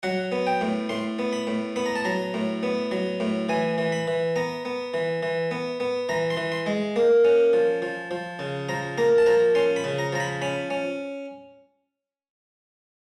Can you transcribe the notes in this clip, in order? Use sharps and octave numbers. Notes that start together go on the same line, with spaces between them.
F#3 F#5
B3
G5
A2
A2 C6
B3
B5
A2
B3 B5
A#5
A5
F#3 A#5
A2
B3
F#3
A2
E3 G#5
E3
B5
E3
B3 A#5
B3
E3
E3
B3
B3
E3 A#5
C6
E3
C6
G#3
A#3
C#4
F3
F3
F3
C#3
F3 A#5
A#3 A#5
A5
F3 A#5
C#4 C6
B5
C#3
A#5
F3 A#5
B5
C#4 B5
C#4